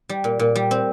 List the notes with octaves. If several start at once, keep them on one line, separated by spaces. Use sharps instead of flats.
G3
A#2
A#2
G3
C4